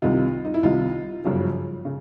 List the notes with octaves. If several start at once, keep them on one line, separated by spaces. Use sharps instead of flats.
C2 C3 D#3 D#4 F4
D#4
E4
C2 C3 D#3 D#4 F4
G1 F#2 C#3 F3
C#3